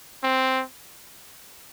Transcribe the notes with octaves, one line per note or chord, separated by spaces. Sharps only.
C4